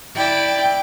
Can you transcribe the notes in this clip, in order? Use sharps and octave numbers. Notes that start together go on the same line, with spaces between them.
E4 D5 G5